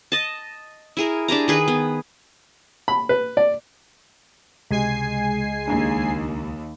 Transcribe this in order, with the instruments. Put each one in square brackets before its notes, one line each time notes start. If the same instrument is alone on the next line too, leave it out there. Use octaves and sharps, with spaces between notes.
[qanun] D#5 A5
E4 G#4 A#4
D4 G4 G#4 A#5
D#3 G#4 B4
B3
[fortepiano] B5
B4
D5
[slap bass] C#2 [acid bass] C3 [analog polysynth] G#3 G#5 C7
[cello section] D#2 [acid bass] D4